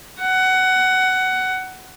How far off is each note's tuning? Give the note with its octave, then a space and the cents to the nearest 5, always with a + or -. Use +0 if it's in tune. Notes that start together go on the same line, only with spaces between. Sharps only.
F#5 +15